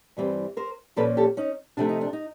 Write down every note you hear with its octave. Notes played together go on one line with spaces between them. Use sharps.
G2 E3 G3 C4
A#4 C5
A#2 F3 A#3 C#4 A4 B4
G4 A4
C#4 D#4
C3 F3 A3 D4
D#4
D4
D#4